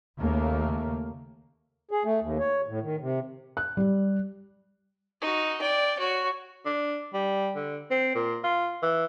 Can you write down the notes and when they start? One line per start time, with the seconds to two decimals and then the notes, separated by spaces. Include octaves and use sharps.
0.19 D#2 C#3 A3 A#3
1.91 G#4
2.04 A3
2.21 D#2
2.40 C#5
2.67 A2
2.82 D#3
3.00 C3
3.57 F#6
3.77 G3
5.21 D#4 F#4
5.61 D5 G5
5.99 F#4 C#5
6.66 D4
7.14 G3
7.56 D3
7.91 C4
8.15 A#2
8.44 F4
8.83 E3